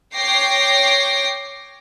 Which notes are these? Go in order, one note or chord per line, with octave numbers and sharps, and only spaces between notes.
C#5 G5 D6 A#6 C7